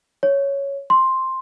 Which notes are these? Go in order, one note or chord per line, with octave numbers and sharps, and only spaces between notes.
C#5
C6